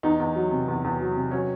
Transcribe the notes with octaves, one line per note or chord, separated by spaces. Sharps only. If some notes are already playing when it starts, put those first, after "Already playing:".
E2 D#4
E2
F#3
C3
E2
E2
F#3
C3
F#3 C#4